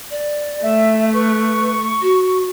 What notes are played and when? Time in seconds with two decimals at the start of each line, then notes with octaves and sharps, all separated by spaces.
0.10 D5
0.63 A3 E5
1.13 B4 C#6
2.01 F#4